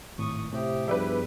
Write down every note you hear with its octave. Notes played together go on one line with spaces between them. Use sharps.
G#1 A2 C#6 D#6
A2 C3 G4 C5 E5 D#6
G2 F3 B3 E4 G#4 B4 D5 E5